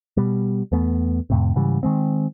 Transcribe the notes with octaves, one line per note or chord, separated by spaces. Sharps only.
B2 G3
E2 A3 B3
F2 A2 C3
G#2 C#3 E3 G3
D#3 G#3 C4